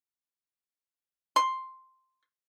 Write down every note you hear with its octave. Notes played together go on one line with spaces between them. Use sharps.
C6